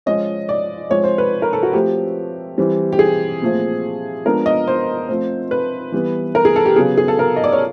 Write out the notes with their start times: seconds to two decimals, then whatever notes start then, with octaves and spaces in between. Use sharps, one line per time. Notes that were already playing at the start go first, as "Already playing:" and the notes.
0.06 F3 G#3 C#4 D#5
0.49 D5
0.90 F3 G#3 C4 C#5
1.04 C5
1.18 B4
1.42 A#4
1.53 A4
1.63 F#4
1.73 F3 A3 C4 G4
2.58 E3 G3 C4
2.92 G4
2.99 G#4
3.42 A#2 F3 A3 C4
4.26 F3 G#3 B3 D4 A#4
4.46 D#5
4.68 C5
5.08 F3 A3 C4
5.51 B4
5.92 E3 G3 B3
6.35 A#4
6.45 G#4
6.56 A4
6.66 G4
6.76 C#3 F#3 B3 G#4
6.98 G#4
7.08 A4
7.19 A#4
7.36 D#5
7.44 D5
7.53 C#5